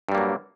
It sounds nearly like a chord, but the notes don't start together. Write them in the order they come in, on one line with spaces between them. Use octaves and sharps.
G2 G3 A#3 F#3